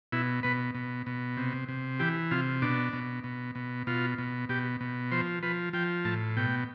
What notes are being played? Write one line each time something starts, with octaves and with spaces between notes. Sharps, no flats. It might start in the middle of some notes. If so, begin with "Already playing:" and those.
B2 E4
B2 B4
B2
B2
C3
C3
E3 G4
C3 F4
B2 D4
B2
B2
B2
B2 F4
B2
B2 G4
B2
F3 C5
F3 B4
F3 G5
A2 A5
B2 G5